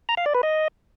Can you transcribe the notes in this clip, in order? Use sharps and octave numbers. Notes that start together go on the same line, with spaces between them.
A#5
F5
D5
B4
D#5